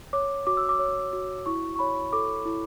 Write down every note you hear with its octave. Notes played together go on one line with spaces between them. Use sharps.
C#5 D6
F#4 D6
E6
D6
C#5
F#4
E4 C#6
C#6
C#5 B5
A4 D6
E4